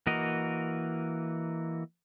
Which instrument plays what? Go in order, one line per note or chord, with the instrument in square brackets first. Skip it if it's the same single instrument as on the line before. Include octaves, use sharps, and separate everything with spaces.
[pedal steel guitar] E3 A#3 F#4 A#4 D#5